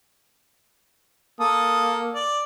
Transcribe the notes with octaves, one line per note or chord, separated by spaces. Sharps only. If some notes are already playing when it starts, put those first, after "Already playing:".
A#3 A4 D#6
D5